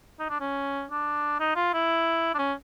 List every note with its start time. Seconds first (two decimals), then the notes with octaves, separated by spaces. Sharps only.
0.19 D#4
0.30 D4
0.41 C#4
0.91 D4
1.40 D#4
1.56 F4
1.73 E4
2.34 D4
2.38 C#4